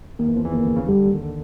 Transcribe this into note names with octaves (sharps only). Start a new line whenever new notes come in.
D#2 D#3 A#3
E2 E3
F2 F3
E2 E3
D3 A#3
C#3
C#3
D3 G3
D#2 D#3
D3